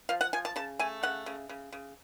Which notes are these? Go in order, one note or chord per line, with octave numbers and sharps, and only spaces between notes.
F3 F5
F#5
F3 G#5
A5
C#3 A5
A3 G#5
C#3 F#5
C#3
C#3
C#3